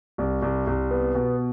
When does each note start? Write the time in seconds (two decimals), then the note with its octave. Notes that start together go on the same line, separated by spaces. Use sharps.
0.18 C2
0.42 C2
0.67 C2
0.91 B3
1.15 B2